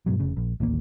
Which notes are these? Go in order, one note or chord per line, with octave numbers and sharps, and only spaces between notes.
G2 B2 F#3
F1 C#3
A#1
D1 A1 D#2 A#3